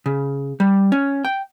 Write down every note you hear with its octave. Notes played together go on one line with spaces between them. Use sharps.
C#3
G3
C#4
G5